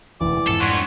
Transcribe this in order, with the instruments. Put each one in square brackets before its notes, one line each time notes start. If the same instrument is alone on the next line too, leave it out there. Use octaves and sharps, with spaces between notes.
[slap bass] E1 D2 [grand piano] E3 [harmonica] D5
[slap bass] F2 G#2 F3 [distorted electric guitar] A4
[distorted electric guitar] G2 [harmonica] C#5 F#5 C6